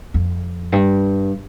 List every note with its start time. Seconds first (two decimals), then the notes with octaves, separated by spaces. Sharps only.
0.14 F2
0.72 G2